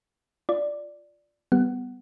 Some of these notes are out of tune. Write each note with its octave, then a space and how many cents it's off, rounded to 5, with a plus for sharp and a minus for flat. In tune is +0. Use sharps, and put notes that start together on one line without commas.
F4 +0 D5 +0
G3 -15 B3 +10 F#5 +15